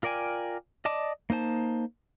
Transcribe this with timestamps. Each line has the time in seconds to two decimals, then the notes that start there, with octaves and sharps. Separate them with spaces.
0.03 F4 A#4 D5 G5 G#5
0.85 D5 D#5 A5 D6
1.30 A#3 D#4 C5 A5